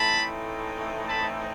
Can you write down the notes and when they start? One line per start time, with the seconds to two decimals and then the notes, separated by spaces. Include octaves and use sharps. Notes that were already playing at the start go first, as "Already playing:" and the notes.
Already playing: A2 E3 A3 C4 D#4 A5 B5
1.09 A5 B5